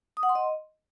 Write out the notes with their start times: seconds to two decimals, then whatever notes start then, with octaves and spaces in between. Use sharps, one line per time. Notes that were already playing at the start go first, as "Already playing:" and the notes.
0.17 D#6
0.23 F#5
0.29 C6
0.35 D#5